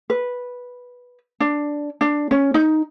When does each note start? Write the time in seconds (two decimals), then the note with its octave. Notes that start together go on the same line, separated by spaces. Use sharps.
0.10 B4
1.40 D4
2.01 D4
2.31 C#4
2.54 D#4